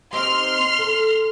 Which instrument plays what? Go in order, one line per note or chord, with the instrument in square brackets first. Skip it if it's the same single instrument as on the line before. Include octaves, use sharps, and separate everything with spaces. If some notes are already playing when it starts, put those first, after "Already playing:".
[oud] C4 D#4 G4 [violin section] C6 F6
[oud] A4